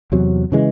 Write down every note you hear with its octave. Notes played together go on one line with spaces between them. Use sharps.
E2 C3 F#3
C#3 E3 G#3